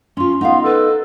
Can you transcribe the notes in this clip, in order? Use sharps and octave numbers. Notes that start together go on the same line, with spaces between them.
C#4 F4 C6
B3 D#4 D#5 F5
A4 B4